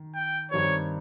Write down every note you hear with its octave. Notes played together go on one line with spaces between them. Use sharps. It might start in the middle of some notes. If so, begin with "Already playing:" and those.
Already playing: D#3
G5
G2 D#3 G3 C4 C#5